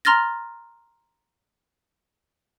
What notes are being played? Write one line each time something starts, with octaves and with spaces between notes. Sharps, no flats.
A#5 C6 F6 A6 A#6